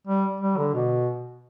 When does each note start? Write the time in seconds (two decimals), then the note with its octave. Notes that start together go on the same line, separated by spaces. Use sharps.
0.07 G3
0.40 G3
0.58 D3
0.74 B2